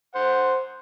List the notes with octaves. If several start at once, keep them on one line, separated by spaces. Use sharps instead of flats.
C5 F#5